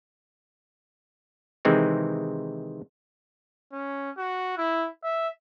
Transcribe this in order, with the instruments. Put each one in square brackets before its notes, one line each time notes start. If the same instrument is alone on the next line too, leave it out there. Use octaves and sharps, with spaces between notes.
[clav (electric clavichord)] C3 D#3 E3 G#3 C4 D#4
[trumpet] C#4
F#4
E4
E5